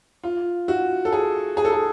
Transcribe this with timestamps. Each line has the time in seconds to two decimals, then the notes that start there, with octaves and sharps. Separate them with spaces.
0.24 F4
0.68 F#4
1.05 A4
1.12 G#4
1.57 G#4
1.65 A4
1.72 G#4